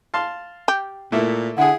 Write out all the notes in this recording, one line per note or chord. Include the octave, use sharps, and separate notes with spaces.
F5 A5 C6
G4
A#2 A3 A#3 E4
D3 E4 G#4 F#5